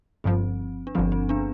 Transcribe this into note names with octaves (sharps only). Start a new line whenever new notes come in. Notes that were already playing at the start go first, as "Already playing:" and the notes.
G1 G2 F3 C4
D4
G1 G2 F3 C4
C4
B3 D4